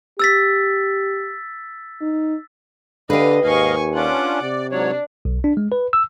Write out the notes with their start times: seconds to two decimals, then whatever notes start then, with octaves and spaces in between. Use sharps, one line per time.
0.19 G4 E6 A6 B6
2.01 D#4
3.10 D3 G4 B4 D#5 F5
3.44 D#2 G#2 D#5 F5 G#5 C#6
3.94 C#4 D4 F4 F#5 D6
4.42 C3 D5
4.71 G#2 F#3 D4 C#5
5.25 B1
5.44 D4
5.57 G#3
5.72 B4
5.93 E6